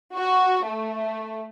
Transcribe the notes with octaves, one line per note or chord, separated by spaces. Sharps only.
F#4
A3